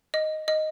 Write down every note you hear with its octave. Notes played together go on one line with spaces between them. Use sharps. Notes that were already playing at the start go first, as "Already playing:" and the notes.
D#5
D#5